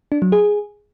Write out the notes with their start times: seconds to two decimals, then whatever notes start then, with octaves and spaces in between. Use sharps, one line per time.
0.12 D4
0.22 F#3
0.32 G#4